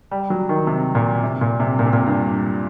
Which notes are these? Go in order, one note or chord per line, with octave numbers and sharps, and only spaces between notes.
G3
F#3
D#3
C3
A#2
C3
A#2
C3
A#2
C3
A#2
G2